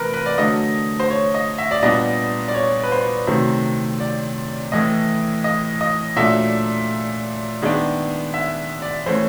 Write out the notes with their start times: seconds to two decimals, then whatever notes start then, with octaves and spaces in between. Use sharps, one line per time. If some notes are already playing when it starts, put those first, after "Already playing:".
Already playing: C3 E3 A3 A#4 B4
0.14 B4
0.26 D5
0.38 D3 F#3 A3 D#5
1.00 C5
1.10 C#5
1.34 D#5
1.58 E5
1.71 D5
1.83 A#2 G3 B3 D4 D#5
2.48 D5
2.54 C#5
2.84 B4
2.92 C5
3.27 C3 D#3 F#3 A3 C4
4.00 D5
4.72 A2 E3 A3 D#5
5.44 D#5
5.81 D#5
6.16 A#2 F#3 A3 D4 E5
7.62 D#3 G#3 B3 D4
8.34 E5
8.82 D5
9.06 E3 A3 C#4 C5